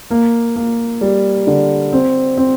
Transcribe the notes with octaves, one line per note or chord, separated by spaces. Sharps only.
A#3
A#3
G3
D3
C4
C4